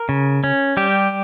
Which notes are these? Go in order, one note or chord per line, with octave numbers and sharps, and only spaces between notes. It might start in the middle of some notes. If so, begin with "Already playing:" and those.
Already playing: A#4
C#3
C#4
G3 G4